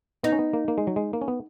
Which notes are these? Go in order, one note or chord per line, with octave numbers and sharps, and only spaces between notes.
B3 D#4
C#4
B3
A#3
A#3
G#3
F#3
G#3
A#3
C#4
B3